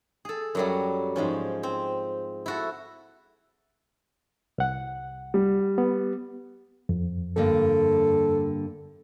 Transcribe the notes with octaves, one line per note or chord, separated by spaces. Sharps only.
G#4 A4
F#2 F#3 G3
G#2 F3 C#4
C4
E4 F#4 A4
C2 F#5
G3
B3
F2
G2 D3 A#3 A4